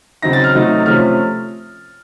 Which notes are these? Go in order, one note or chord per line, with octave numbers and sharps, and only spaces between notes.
C#3 F#3 C4 D#4 A#6
A6
F6
C3 F#3 A3 D#4
C3 F3 A3 C#4 F6